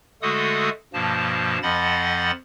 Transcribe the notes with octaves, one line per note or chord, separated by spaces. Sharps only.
D3 G#3 A3 F#4 A4 D#6
G2 B2 F3 A#3 A5
F2 F3 D#5 F#5 B5 A6